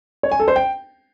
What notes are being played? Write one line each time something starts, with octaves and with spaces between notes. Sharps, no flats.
C#5
G#5
A4
C5
G5